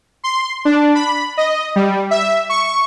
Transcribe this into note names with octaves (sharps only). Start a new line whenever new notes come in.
C6
D4
B5
D#5
G3
E5
C#6